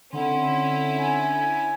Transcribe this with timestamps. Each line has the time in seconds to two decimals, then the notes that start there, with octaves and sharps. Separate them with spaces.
0.13 D3 C4 C#4 E4 F#5 C6
0.99 G#5